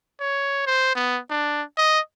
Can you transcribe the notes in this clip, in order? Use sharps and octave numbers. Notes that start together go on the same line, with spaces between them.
C#5
C5
B3
D4
D#5